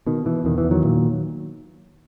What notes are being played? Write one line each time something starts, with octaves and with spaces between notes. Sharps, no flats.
B2 D#3
B2 E3
E2 D#3
E3
E2
D#3 F#3
A#2